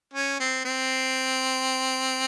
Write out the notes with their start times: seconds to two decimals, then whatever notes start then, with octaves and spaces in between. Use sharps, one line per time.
0.14 C#4
0.40 C4
0.65 C4